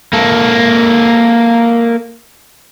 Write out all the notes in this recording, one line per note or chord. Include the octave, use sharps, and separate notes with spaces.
A#3 A4